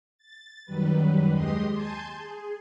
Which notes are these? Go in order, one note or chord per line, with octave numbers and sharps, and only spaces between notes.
A6
F#2 D#3 F#3 G3 B4
D#2 G#3 G4 D#5 C6 D#6
G#5 A5 C6 G6 A6
G#4